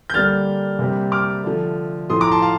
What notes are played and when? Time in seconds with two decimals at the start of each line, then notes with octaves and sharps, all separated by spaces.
0.10 G6
0.14 D3 G3 A#3 F6 A6
0.79 C3 G3 A#3
1.12 D6 F6
1.44 D3 F3 A3
2.10 A2 F3 A3 C6 D#6
2.21 A#5 D6
2.32 A5 C6
2.42 F5 A5